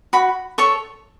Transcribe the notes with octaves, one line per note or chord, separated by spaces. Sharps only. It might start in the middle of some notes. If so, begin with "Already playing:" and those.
F#4 B5
A4 C#5 C#6